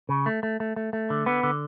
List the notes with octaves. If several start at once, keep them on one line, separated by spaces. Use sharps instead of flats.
C#3
A3
A3
A3
A3
A3
D3
D3 B3
D3